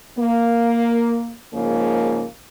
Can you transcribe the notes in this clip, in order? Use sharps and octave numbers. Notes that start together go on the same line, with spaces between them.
A#3
G#2 C#3 F3 A#3